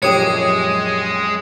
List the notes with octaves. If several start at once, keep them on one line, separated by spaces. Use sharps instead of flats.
A#1 F#2 G#3 G4 C#5 D#6 G#6 C#7